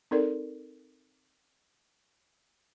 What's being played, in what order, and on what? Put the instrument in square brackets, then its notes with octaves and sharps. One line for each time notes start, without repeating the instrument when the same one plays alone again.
[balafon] C4 D#4 A4 A#4 D5